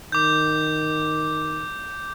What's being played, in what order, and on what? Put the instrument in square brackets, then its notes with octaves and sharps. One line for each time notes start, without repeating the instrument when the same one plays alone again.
[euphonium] D#3 [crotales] D6 G6